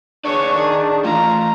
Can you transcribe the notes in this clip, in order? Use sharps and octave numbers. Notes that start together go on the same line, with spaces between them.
D4 G#4 B4 C#5 D5 C#6
D#3 G#4
E3 A3 F4 A#5